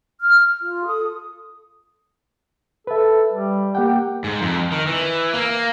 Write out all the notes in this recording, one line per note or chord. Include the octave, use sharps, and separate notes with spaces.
F6
F4
A4 D#6
A4 B4 E5
G3
A#3 G4 F#5 G5
G#2
F2
D#3
E3
A#3